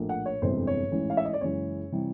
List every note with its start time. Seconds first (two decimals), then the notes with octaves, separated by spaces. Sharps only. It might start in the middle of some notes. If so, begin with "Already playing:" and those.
Already playing: A#1 A2 F3 A#3
0.09 F#5
0.26 C#5
0.42 G1 F2 C3 E3 G#3 C5
0.67 C#5
0.92 A1 G#2 E3
1.10 F5
1.17 E5
1.25 D#5
1.33 D5
1.41 F#1 F#2 C#3 E3 G#3 C#5
1.92 C3 E3 G3